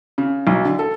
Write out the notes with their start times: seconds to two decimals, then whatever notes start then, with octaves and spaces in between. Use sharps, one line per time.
0.18 C#3
0.47 B1
0.65 D3
0.79 A4